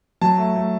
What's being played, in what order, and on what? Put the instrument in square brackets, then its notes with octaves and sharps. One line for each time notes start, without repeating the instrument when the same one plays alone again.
[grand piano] F#3 A5
A3
A3